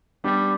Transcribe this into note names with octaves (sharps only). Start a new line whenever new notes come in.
G3 B3 D4